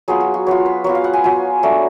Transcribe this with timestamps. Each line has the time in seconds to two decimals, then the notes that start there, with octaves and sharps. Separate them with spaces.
0.08 F#3 B3 F4 G#4
0.20 F#4
0.34 F#4
0.47 F#3 B3 F4 C#5
0.66 B4
0.84 F#3 B3 F4 C#5
0.95 F5
1.04 F#5
1.13 G#5
1.24 F#3 B3 F4 G#5
1.63 F#3 A3 D4